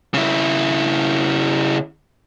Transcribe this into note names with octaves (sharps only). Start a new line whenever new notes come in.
C#3 E4